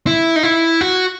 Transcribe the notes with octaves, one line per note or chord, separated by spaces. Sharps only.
E4
D#4
E4
F#4